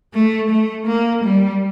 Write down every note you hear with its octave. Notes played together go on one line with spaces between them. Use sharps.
A3
A3
A#3
G3